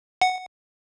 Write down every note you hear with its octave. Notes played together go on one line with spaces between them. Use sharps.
F#5